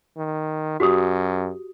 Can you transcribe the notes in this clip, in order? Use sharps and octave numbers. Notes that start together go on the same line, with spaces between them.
D#3
F#2 F#4 G4 D#6